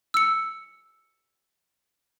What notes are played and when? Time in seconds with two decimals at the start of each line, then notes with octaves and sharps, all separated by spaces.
0.14 E6 C#7